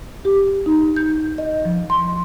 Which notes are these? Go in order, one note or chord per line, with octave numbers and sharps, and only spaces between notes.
G4
D#4
G6
D#5
F3
C6